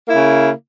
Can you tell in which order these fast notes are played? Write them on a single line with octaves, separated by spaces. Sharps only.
A#3 E4 C#3